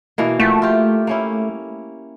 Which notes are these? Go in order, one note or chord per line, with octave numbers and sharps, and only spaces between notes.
B2 E3 A#3
F3 A3 F#4
F4 G4
A#3 C#4 E4